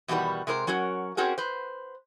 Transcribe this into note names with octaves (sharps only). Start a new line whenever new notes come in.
E2 B2 D#3 G3 F#4 B4
C3 G#3 A#4 C5
F#3 C#4 F#4 A#4
C4 C#4 F#4 G#4 A#4
B4 C5